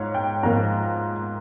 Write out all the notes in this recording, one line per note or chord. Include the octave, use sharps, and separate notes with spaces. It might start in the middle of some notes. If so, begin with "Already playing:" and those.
Already playing: G#2 F4 C#5 F5
G5
G#2 F3 A#3 F4 A#5